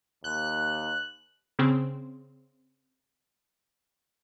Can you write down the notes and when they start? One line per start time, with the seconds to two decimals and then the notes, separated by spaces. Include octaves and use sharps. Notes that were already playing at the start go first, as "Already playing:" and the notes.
0.24 D#2 F#6
1.59 C#3 C4